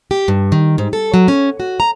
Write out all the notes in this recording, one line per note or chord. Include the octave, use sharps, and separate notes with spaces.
G4
G2
D#3
G#2
A4
F#3
C#4
F#4
A#5